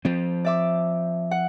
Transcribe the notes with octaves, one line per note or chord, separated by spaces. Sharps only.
F3 C4
D5 E5 D6
F#5